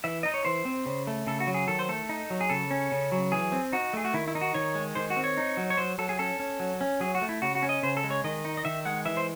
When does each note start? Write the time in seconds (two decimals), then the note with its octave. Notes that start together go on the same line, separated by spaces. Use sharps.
0.04 E3 E5
0.23 D#4 D#5
0.34 C#5
0.45 E3 C5
0.65 C4
0.86 C#3
1.07 A3
1.27 C#3 A4
1.40 F#4
1.47 F#3
1.54 G#4
1.68 D#3 A4
1.79 C5
1.88 A3 A4
2.09 D#4
2.30 F#3
2.41 G#4
2.50 C#3 A4
2.71 C#4
2.92 C#3
3.12 F#3
3.32 E3 G#4
3.52 C4
3.72 D#4 F#4
3.93 A3 G#4
4.05 F#4
4.14 D#3 E4
4.28 E4
4.35 D#4
4.41 F#4
4.54 D#3 C#5
4.75 G#3
4.95 D#3 C5
5.10 F#4
5.16 C4
5.24 C#5
5.37 D#4
5.57 F#3
5.70 C#5
5.77 F#3 C5
5.98 F#3 A4
6.09 G#4
6.19 C#4 A4
6.39 C#4
6.60 F#3
6.81 C#4
7.00 F#3 G#4
7.15 F#4
7.22 A3
7.29 E4
7.42 C#3 F#4
7.55 F#4
7.62 C#4
7.69 D#5
7.83 C#3 C5
7.97 A4
8.04 G#3
8.11 C#5
8.24 D#3 D#5
8.45 D#4
8.57 D#5
8.65 D#3 E5
8.85 G#3 F#5
9.05 E3 E5
9.17 C5